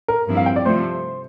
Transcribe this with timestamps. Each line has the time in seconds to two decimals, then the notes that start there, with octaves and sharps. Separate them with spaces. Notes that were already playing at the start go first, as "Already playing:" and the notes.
0.08 A#4
0.27 G2 F3 C4 E4
0.37 F5
0.46 G5
0.56 D5
0.65 C3 F3 A3 C5